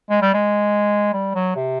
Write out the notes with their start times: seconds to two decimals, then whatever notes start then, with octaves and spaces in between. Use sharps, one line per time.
0.10 G#3
0.22 G3
0.34 G#3
1.13 G3
1.35 F#3
1.56 C3